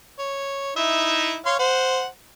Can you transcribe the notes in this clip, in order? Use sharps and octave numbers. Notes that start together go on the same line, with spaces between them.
C#5
D#4 E4 E5
C#5 F5 C6
C5 F#5